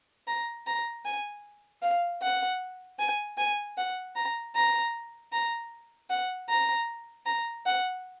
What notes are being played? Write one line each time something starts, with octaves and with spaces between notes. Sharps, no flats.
A#5
A#5
G#5
F5
F#5
G#5
G#5
F#5
A#5
A#5
A#5
F#5
A#5
A#5
F#5